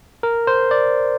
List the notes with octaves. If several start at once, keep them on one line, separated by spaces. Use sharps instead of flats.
A#4
C5
D5